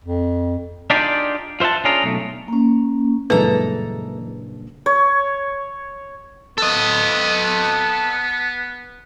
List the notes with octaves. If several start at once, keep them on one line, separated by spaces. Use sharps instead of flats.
F2
D4 D#4 F4 G4 G#4 D5
F4 C5 E5 F#5 A5
C#4 D4 F4 G#4 A#4
B1 A3
A#3 C#4
F#1 G2 A#2 E3 G#3 A4 B4 A#5
C#5
B3 A4 D#5